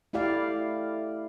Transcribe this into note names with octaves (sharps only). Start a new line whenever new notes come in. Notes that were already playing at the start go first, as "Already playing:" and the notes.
A3 E4 G4 D5 F5